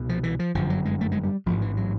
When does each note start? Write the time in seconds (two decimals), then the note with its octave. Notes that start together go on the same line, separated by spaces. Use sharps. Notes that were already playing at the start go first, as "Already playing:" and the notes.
Already playing: C2 B2
0.09 F3
0.23 E3
0.39 F3
0.54 G1 F#2 D3 F3
0.70 F#3
0.85 G#3
1.01 A3
1.12 G#3
1.23 G3
1.46 A1 G#2 F3
1.62 E3
1.77 F#3